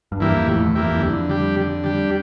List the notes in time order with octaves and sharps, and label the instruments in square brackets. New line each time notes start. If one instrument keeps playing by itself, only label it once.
[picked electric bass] G2
[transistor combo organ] E3 A#3 E4 G4
[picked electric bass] F2
[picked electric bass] F2 [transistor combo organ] A2
[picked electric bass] E2
[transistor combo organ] E3 A#3 E4 G4
[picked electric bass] F2
G2
[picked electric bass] F2 [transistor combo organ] D3
[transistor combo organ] G3 D4 G4
D3
G3 D4 G4